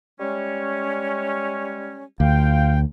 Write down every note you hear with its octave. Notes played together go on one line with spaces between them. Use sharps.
G3 G#3 C#4
D2 F4 F5 G5